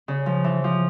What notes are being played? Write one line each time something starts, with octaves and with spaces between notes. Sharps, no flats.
C#3
F3
E3
F3